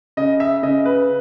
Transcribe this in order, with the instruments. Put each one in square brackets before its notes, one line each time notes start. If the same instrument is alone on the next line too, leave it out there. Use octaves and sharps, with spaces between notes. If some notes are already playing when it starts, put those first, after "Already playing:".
[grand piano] C#3 D#5
E5
C#3 D#5
B4